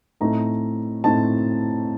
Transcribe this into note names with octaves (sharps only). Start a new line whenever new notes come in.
A2 A3 C4 D#4 A#5
A2 A3 C4 D#4 A5